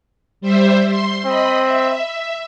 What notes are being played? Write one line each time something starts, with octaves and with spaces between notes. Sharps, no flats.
G3 C5 E5
C6
C4 D#5 B5
E5